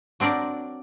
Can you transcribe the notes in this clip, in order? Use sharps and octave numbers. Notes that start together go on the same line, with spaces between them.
F#3 C4 D4 A#4 D5